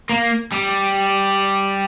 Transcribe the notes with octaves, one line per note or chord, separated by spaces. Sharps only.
A#3
G3